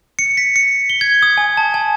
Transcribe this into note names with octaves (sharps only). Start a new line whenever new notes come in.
C#7
B6
C#7
G7
G#6
D#6
G#5
A5
G#5